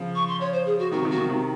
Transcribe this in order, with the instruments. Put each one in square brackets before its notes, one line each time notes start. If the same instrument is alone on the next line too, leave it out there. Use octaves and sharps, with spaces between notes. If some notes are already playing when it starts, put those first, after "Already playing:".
Already playing: [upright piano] C#3 F3
[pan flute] C#6
C6
C#5
C5
G#4
F#4
[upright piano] C3 D#3 [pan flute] F#4
[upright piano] C3 D#3
[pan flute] F#4
[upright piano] C3 D#3
C3 D#3